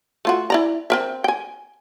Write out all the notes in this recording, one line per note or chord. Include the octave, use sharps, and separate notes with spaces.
A3 F4 F#4
E4 D5 A#5
C4 A#4 E5
G5 G#5